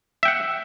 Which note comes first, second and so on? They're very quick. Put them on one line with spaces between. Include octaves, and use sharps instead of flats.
E5 G5 F#5